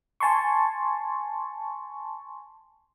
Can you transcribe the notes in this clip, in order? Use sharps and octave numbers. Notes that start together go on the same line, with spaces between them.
G#5 A5 C6 C#6